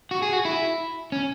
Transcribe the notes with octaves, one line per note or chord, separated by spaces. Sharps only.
F#4
G#4
F#4
E4
C#4